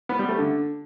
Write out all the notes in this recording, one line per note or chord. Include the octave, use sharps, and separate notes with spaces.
B3
G3
A3
D3